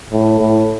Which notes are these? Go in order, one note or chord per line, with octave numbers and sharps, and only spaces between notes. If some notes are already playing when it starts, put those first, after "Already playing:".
A2
A2